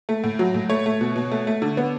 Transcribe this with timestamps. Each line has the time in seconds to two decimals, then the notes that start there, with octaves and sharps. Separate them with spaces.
0.09 A3
0.24 A2
0.39 F#3
0.54 A2
0.69 A3 C#5
0.86 A3
1.01 B2
1.16 B2
1.31 A3
1.47 A3
1.62 D3
1.77 B3